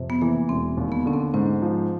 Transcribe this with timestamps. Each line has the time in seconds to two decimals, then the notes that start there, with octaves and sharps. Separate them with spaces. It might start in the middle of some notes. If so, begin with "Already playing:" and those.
Already playing: F2 C3
0.10 B3
0.22 E3 A#3
0.49 E1 C4
0.77 D#2
0.92 B3
1.06 D3 C#4
1.13 C4
1.34 G#2 C#4
1.62 F3